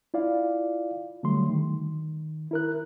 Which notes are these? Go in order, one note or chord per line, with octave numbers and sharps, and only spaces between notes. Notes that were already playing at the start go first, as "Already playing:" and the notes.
E4 F4 D5 F5
D3 F#3 G3 A3 C6
D#3
E4 A#4 F#6